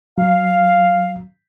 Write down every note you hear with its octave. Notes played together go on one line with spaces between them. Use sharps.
F#3 F5